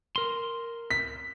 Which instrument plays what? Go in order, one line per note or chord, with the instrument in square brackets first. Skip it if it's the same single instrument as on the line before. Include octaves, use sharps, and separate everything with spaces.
[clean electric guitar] A#4 C6
[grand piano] B6